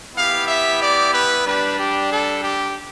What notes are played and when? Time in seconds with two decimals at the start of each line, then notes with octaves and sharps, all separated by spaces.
0.15 B3 E4 G4 F5
0.48 E5
0.81 D5
1.13 B4
1.45 G3 D4 G4 B4
1.78 G4
2.11 A4
2.44 G4